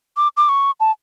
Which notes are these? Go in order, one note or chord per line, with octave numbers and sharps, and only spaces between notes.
D6
D6
C#6
A5